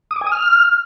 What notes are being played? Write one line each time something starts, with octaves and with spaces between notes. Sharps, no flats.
D#6
D6
G#5
D#6
F6